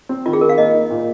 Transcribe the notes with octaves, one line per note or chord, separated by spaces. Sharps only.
C4
D#3 F4
G#4
D#3 A#4
F5
A#3 D#5
D#4
A#2